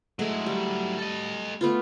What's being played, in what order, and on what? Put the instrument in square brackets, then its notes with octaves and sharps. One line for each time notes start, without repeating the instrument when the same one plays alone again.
[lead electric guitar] F#3 E4 [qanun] G#3 A3 A4
[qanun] G3
[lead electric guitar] A4 D#5
[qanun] A3 B3 F4